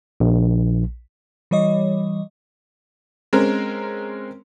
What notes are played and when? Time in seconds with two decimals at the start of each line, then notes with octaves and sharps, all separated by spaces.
0.20 A#1
1.51 E3 G3 C#5 D#5
3.33 G#3 C4 C#4 A#4